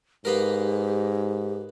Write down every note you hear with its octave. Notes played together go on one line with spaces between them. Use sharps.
G#2 A#3 B3 G4 A#4